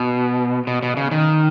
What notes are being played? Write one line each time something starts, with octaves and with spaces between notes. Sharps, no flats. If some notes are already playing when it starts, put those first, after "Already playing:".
Already playing: B2
B2
B2
C#3
D#3